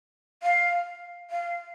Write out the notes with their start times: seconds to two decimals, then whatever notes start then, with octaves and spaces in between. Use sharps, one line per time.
0.43 F5
1.30 F5